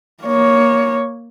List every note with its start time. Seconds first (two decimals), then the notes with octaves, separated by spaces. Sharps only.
0.23 A#3 C#5